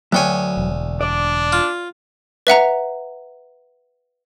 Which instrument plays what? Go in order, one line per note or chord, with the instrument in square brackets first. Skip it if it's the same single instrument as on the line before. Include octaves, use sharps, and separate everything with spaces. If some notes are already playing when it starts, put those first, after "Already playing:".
[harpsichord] D2 G5 G#5 [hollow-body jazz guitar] F#3 B3 C#5
[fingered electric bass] E1
[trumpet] D4 [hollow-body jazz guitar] D5
[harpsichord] F4
[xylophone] B4 E5 F#5 A#5